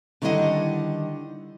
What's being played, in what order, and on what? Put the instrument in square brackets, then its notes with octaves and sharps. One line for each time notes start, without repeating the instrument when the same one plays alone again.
[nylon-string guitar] D3 D#3 G3 E4 D#5 F#5